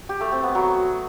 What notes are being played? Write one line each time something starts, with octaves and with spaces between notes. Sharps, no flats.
G4
A3
C4
B3
F#3